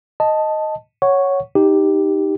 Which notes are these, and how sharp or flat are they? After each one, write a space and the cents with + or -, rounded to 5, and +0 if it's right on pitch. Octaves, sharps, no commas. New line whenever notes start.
D#5 +0 A5 +0
C#5 +0 F#5 +0 C#6 +0
D#4 +0 G4 +0